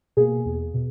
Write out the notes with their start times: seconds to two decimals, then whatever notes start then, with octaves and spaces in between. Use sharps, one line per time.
0.17 B2 A#3 G#4
0.45 E2
0.74 B2